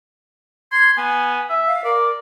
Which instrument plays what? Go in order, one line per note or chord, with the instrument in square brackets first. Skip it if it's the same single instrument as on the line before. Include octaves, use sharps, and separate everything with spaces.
[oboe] C6 [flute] G#6
[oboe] B3 [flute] G#5
[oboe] E5
[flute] F5
[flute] A#4 [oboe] D5